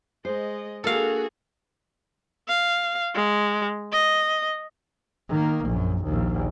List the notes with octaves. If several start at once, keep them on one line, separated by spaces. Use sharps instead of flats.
G#3 C5 D#5
A#3 D4 F#4 G#4 A4 F5
F5
G#3
D#5
D#3 A#3
A#1 F#2
A#1 D#2